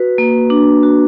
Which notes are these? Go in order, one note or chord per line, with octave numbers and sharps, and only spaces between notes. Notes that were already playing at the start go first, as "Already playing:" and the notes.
Already playing: F#4 B4
A#3
D4
F#4